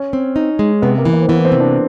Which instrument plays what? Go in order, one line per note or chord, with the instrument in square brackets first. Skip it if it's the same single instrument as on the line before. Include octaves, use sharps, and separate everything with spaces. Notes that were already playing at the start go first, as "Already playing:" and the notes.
Already playing: [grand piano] C#4
[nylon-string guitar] C4
D#4
G#3
[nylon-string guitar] C3 [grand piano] B3
[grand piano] A#3
[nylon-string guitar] E3
[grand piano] A#3
C4
[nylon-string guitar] E3 [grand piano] B3
[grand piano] C4
[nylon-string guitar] C3
[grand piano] D4